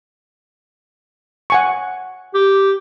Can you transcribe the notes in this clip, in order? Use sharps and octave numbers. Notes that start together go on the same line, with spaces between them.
F#5 G#5 C#6
G4